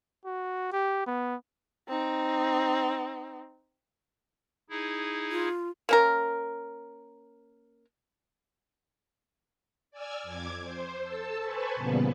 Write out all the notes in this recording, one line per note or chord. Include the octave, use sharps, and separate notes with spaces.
F#4
G4
B3
C4 D#4
D#4 E4 G#4
F4
A#3 C#4 A#4
D5 G#5 E6 F6 G#6
F2 D6 G#6
C5
A4 A5 E6
B4 C5 G#5 A5 B5 C#6
E2 A#2 C#3 G3 B3